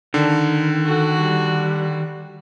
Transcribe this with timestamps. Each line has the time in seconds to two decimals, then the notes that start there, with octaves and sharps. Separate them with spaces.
0.14 D3 D#3
0.86 F#4 A4
1.22 G3